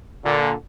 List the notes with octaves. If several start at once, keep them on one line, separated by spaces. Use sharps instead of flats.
A#2 D3